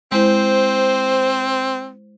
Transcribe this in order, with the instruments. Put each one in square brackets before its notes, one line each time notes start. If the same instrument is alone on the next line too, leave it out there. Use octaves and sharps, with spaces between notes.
[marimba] G#3 E4 [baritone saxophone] C4 [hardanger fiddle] C5